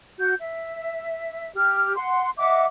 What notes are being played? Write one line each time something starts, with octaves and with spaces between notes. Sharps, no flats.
F#4 G6
E5
G4 F6
F#5 C6
D#5 E5 F#5 D6